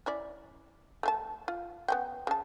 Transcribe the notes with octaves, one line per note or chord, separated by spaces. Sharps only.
C#4 E4 D5
A3 A4 A5
F4
B3 C#4 G5
C#3 A5